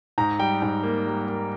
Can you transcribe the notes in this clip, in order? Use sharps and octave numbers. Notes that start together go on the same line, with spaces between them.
G#2 A#5
G3 G5
G#2
A#3
G3
A#3